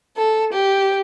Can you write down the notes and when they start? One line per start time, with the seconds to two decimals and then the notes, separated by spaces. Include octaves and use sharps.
0.17 A4
0.53 G4